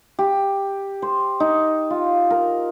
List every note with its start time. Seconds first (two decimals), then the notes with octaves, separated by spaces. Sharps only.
0.19 G4
1.02 C5
1.40 D#4
1.90 F4
2.30 A#4